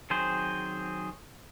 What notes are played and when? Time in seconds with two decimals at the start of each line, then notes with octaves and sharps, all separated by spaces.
0.10 D#3 F#3 C4 G#4 C5